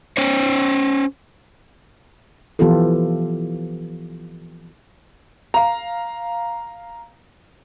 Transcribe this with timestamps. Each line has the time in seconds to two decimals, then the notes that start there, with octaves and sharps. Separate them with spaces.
0.17 C#4 C5 C#5
2.59 E3 F3 B3 F4 G4 A4
5.54 F5 A#5